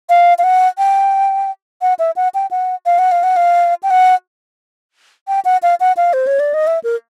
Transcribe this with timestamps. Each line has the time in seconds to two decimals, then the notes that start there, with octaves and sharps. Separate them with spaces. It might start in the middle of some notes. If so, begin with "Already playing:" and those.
0.09 F5
0.39 F5
0.44 F#5
0.78 G5
1.82 F#5
1.99 E5
2.16 F#5
2.34 G5
2.51 F#5
2.86 F5
2.99 F#5
3.12 F5
3.23 F#5
3.36 F5
3.83 G5
3.90 F#5
5.28 G5
5.45 F#5
5.63 F5
5.80 F#5
5.97 F5
6.13 C5
6.27 C#5
6.40 D5
6.54 D#5
6.67 E5
6.84 A#4